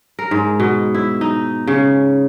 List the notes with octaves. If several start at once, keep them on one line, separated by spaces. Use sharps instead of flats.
A#4
G#2
B2
E4
D#4
C#3